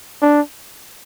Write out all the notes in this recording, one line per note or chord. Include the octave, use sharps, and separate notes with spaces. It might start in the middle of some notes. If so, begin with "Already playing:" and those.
D4